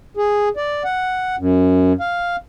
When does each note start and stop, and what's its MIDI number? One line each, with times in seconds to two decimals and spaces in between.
0.17 0.49 68
0.57 0.83 74
0.85 1.36 78
1.39 1.93 42
2.00 2.36 77